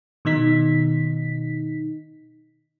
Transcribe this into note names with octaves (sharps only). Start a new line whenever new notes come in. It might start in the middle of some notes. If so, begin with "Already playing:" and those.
B2 D#3 D#4 B6